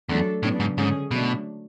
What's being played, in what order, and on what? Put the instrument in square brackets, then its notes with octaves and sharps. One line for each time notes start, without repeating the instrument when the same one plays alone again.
[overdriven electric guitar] E2 [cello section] F#3 A3 D4 A4
[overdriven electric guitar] A2 [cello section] C#3 F#3 B3 D4
[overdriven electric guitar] G#2
[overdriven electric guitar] G#2 [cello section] D3 G#3 C#4 G#4
[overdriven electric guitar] B2 [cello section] F#3 A3 D4